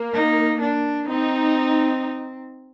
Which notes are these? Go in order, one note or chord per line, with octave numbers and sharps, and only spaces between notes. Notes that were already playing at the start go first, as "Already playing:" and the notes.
Already playing: A#3
D#4
D4
C4 D#4